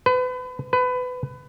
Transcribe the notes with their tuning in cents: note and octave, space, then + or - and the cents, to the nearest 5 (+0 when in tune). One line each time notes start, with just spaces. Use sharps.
B4 +35
B4 +25